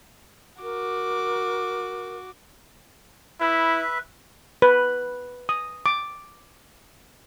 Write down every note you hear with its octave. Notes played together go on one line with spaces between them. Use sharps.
F#4 A#4 D6
E4 B4 E5
B4
D#6
D6